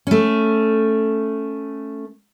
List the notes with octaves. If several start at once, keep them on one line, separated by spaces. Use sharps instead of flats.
A3 C#4